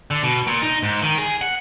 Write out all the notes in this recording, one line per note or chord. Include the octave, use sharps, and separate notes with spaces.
D3
B2
A#2
D#4
G#2
D#3
G#4
F#5